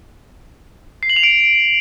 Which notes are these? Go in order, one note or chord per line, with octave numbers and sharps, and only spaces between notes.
C7
F#7
F7
D7